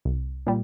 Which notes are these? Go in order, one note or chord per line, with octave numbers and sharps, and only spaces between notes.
C2
A#2 G3